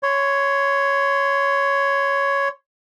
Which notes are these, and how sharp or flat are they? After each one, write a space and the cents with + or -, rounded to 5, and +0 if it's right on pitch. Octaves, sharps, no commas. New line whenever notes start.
C#5 +5 C6 -20